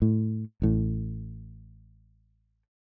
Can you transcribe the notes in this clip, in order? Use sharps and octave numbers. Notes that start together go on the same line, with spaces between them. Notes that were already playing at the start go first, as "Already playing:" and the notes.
A2
A1 A2